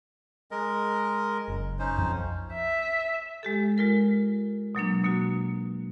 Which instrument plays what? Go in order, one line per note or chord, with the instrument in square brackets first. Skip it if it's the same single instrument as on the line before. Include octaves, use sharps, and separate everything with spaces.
[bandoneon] G#3 A#4 D#5
[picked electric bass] F#1
[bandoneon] C#4 D#4 C5
[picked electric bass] B1 F2 F3
[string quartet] E5
[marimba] G#3 G4 A4
G#3 F4 A#4
B2 F#3 A#3 D4
B2 A#3 F#4